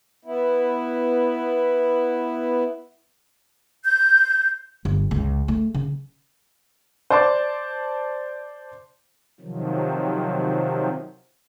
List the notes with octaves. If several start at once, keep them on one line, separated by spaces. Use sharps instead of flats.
B3 E4
G6
G1
C#2
A3
C#3
C5 D5 A5 C6 D6
C3 D#3 F3 F#3